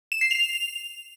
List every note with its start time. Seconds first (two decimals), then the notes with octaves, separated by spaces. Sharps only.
0.12 E7
0.21 C7
0.31 F7